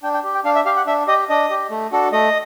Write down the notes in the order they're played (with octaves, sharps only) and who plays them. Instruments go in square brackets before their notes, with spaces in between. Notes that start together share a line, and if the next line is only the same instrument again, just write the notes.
[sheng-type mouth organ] D4 G5
G5
G4
G5
D4 F5
E5
G4 F5
F#5
D4 E5
G4 D#5
D4 D#5
G4
A3
D4 F#4 A4
A3 D#5